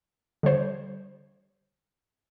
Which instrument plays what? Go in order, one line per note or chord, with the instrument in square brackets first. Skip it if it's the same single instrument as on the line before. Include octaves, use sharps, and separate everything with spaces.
[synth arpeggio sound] D3 G3 C5 C#5